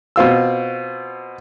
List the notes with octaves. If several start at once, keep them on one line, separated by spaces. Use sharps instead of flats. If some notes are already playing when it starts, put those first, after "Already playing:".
B2 C4 F4 E6